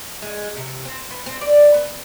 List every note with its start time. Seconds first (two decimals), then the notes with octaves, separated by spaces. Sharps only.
0.22 G#3
0.57 C3
0.85 C4
1.11 B3
1.26 C4
1.41 D5
1.74 B3